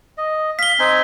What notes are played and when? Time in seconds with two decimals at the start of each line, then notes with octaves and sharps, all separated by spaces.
0.18 D#5
0.59 F5 B6 G7
0.79 C4 D#4 G#5